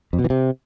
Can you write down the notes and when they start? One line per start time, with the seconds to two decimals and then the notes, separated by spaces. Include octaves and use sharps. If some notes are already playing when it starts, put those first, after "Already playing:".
0.13 F2
0.19 B2
0.24 E3
0.30 C3